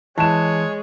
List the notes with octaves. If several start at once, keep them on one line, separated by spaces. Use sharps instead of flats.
E3 G#3 C#5 A5 E7